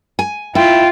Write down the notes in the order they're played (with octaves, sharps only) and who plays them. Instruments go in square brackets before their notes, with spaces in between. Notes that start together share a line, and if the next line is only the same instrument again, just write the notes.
[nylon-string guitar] G#5
[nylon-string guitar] E4 [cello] F4 [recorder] G5